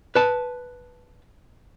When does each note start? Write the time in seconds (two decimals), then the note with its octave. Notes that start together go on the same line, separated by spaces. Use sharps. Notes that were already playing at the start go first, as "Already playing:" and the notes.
0.15 B4 A5